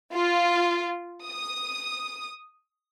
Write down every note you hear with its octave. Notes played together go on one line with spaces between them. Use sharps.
F4
D#6